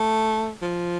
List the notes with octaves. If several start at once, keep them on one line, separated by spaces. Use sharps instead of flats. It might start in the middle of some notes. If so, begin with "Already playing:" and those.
Already playing: A3
F3